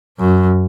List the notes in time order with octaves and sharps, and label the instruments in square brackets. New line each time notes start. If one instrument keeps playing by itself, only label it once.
[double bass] F#2